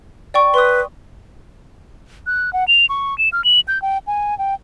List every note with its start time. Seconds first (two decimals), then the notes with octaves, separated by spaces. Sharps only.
0.34 D5 G5 C#6
0.54 B4 C6 D#6
2.27 F#6
2.53 F#5
2.68 F7
2.89 C#6
3.18 E7
3.33 F6
3.44 F#7
3.68 G6
3.82 G5
4.07 G#5
4.39 G5